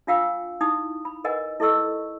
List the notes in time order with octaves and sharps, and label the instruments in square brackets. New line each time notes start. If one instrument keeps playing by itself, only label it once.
[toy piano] D4 F4 F5 G5 E6
D#4 E4 D#6
B5
A#4 B4 D#5 F#5 G#5
E4 A4 D#5 C#6 E6